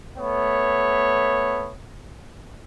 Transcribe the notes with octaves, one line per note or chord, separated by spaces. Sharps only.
A3 B3 C#5